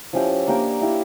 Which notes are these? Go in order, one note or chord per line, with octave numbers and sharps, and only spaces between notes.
F3 C#4 E4 G4
A#3 D4 G4 A#4
A#3 E4 G4 C#5